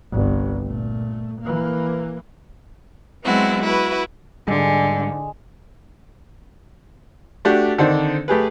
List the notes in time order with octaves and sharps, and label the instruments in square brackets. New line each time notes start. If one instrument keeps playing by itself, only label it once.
[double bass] G1 C2
A#2 A3
E3 A#3
[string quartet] F#3 G#3 B3 C4 E4 F#4
E4 F#4 B4
[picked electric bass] G#2 G3 [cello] D3 [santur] G#3
[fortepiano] A3 D4 F#4 G4
D3 D#3 C4 D4 D#4 C5
A3 G4 G#4 B4